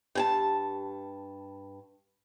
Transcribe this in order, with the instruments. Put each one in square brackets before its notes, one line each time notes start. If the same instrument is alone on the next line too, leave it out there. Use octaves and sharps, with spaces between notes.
[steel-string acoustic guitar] G2 G#5 A5